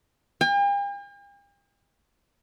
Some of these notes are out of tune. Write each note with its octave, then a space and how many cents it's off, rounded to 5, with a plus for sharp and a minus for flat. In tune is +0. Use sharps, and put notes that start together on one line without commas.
G5 +45